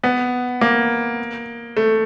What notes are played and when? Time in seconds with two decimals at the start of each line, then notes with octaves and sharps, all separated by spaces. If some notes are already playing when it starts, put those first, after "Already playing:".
0.04 B3
0.61 A#3
1.77 A3